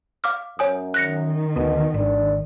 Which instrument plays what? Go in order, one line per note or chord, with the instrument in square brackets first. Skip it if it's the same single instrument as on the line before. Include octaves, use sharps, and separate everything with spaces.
[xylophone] F5 D6 F6
[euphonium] F#2 [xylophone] C#5 G#5 D#6
[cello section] D#3 [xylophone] F#6 A#6 C#7
[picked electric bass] D2 B3 [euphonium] B2
[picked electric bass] G#1 [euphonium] D4